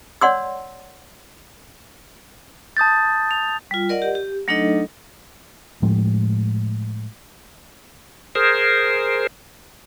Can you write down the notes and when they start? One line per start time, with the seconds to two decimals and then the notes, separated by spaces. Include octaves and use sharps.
0.21 C#5 D5 F#5 C6 E6
2.77 A5 D#6 G6 A6
3.31 F7
3.71 G3 F4
3.89 A#4 D5 D#5 F#5
4.02 G4
4.15 G4
4.48 F#3 A3 D4 D#4 A4 D#5
5.82 A2 F3 G#3
8.35 G#4 A#4 C5